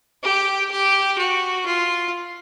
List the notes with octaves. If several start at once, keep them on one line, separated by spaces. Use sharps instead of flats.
G4
G4
F#4
F4